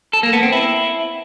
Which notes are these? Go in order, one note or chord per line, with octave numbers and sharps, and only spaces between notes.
A4
A#3
B3
C4
E4